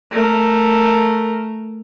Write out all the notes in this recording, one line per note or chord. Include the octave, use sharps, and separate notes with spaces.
A3 A#4